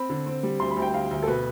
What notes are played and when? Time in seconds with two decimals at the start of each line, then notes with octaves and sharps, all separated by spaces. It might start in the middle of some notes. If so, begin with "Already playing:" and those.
Already playing: C4 B5
0.10 D3
0.26 C4
0.43 G3
0.59 D2 C6
0.71 B5
0.77 D2
0.82 G5
0.93 D2 F5
1.11 D2
1.23 A4
1.27 B2 B4